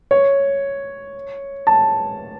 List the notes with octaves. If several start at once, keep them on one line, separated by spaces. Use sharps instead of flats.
C#5
A5